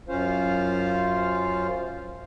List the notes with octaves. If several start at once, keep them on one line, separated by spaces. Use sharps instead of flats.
F#2 C#4 F4 C5 F5